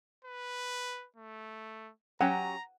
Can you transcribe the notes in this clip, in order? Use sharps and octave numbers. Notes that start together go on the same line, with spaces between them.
B4
A3
F#3 C#4 G4 F#5 A#5